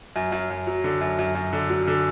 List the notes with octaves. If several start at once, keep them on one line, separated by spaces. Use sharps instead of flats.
F#2
F#2
F#2
F#3
D3
F#2
F#2
F#2
D3
F#3
D3